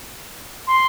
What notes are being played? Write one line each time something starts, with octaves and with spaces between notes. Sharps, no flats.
C6